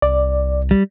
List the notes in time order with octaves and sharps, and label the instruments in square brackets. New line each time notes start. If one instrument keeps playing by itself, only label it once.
[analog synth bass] C2 [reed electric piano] D5
[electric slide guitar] G3